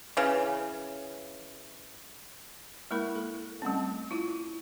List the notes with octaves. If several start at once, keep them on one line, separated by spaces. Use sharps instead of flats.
C#3 E3
G#3 A#3 E4 A#4 B5
A4
G3 A3 C4 C#4
E4 F4